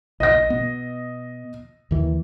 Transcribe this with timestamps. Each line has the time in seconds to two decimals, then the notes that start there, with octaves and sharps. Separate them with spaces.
0.20 B1 D#5 A#6
0.50 B2 B3
1.91 D#2 D#3 E3